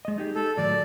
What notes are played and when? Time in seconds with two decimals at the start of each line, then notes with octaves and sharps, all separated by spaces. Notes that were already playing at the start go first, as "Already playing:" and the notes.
0.05 G#3 D#5
0.18 D#4 G4 G#4
0.35 A4
0.57 A2 D#3 F#3 D5